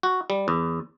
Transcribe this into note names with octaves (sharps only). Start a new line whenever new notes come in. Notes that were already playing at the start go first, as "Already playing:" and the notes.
F#4
G3
E2